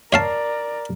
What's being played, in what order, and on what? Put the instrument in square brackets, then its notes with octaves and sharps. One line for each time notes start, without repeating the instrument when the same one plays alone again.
[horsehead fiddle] A#4 D5 [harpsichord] C#5 F5 A5